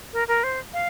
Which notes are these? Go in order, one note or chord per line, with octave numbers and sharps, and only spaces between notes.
A#4
A#4
C5
F5